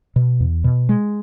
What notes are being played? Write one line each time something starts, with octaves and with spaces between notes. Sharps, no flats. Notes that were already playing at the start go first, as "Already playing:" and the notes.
B2
E2
B2
G#3